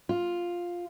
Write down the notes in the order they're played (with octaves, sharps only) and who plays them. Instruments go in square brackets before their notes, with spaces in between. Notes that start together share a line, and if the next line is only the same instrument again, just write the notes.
[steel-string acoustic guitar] F4